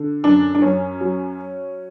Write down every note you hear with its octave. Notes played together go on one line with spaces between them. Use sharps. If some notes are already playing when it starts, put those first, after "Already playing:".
Already playing: D3
F#2 D4
D4
F#2 C#4
F#3